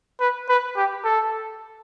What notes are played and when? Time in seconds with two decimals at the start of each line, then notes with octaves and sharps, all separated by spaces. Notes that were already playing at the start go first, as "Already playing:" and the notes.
0.20 B4
0.49 B4
0.77 G4
1.05 A4